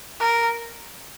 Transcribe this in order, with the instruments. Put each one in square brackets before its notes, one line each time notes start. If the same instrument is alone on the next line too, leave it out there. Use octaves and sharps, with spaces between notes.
[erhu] A#4